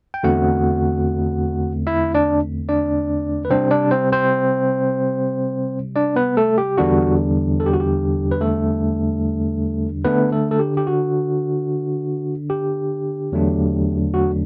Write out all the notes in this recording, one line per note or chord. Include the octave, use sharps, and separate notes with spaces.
G5
E2 D3 A3 C4 F#4 F#5
E4 E5
D4 D5
D4 D5
B4
C3 G3 C4 D4 C5
D4 D5
C4 C5
C4 C5
D4 D5
B3 B4
A3 A4
G4
E2 D3 G3 D4 F#4
A4
G4
F#4
G4
B4
A3 A4
D3 A3 B3 D4 B4
A3 A4
A4
G4
G4
F#4
G4
E2 D3 F#3 A3 D4
F#4